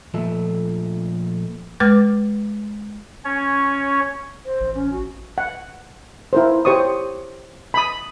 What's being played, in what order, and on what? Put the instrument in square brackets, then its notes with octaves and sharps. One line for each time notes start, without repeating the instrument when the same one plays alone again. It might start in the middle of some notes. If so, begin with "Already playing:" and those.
[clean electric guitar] A#2 F3 A3 A4 E5
[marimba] G#3 B4 D6 F6 A6
[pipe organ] C#4 C#5
[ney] C5
[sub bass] A1
[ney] C#4
F#4
[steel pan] F#5
E4 A#4 C5
G4 C5 C#5 C#6 D#6
B5 D#6